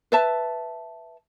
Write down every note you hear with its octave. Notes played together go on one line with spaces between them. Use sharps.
B4 E5 A5